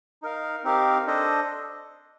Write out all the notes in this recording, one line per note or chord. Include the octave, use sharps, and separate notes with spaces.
D#4 A#4 F5
C4 D#4 G4 A#4 F5
D4 A4 C5 D#5